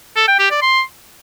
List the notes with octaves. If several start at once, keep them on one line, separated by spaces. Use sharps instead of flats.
A4
G5
G4
D5
C6